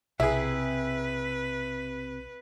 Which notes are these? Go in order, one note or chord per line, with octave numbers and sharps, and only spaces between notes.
B1 C3 E4 G#4 B4